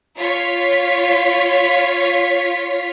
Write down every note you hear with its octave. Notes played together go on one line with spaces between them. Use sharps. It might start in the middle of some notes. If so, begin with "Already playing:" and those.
F4 C#5 B6